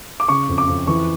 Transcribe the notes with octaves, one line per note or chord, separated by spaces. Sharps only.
D6
C#3 C#6
F2
D6
F2
E3 C#6